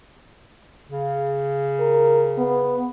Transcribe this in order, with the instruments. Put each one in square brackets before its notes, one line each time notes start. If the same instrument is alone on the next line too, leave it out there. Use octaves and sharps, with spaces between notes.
[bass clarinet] C#3
[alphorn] A#4
B3